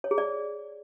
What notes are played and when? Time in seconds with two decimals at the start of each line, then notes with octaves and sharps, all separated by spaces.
0.04 C#5
0.11 G#4
0.18 D5